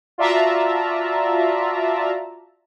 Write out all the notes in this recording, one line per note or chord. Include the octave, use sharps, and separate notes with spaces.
F4 F#4 D5 E5 A5 A#5